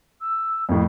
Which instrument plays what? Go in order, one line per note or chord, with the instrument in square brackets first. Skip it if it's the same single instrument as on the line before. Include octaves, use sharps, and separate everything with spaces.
[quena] E6
[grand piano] F2 A2 [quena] A#4